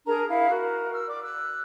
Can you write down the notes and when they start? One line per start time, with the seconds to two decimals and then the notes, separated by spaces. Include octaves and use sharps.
0.06 D4 G#4 A#4 A#5
0.28 E4 F5
0.49 F#4 A#4
0.92 E6 F6
1.06 D5 D6
1.22 E6 F#6